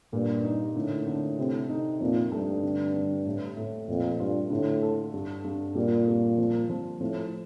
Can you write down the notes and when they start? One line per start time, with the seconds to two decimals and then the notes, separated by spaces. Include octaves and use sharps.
0.13 G2 A#2
0.44 D#4
0.75 A2 D3
1.07 D3
1.39 C3
1.69 D#4
2.01 F2 A#2
2.32 G2 A3
2.63 D3
2.94 D3
3.26 A2
3.57 A2
3.88 F2 A#2
4.20 G2 F4
4.50 A2 D3
4.82 A4
5.14 G2
5.44 G2
5.75 A#2 G3
6.08 G3
6.38 F3
6.70 F3
7.01 A2 F3